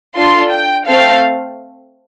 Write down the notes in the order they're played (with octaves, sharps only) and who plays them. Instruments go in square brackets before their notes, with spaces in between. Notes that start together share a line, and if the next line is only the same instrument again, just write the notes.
[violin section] D4 F4 A4 C6
G5
A3 C4 A4 F5